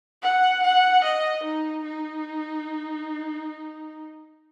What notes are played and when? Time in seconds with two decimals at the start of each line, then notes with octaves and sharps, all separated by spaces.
0.23 F#5
0.63 F#5
1.04 D#5
1.44 D#4
1.85 D#4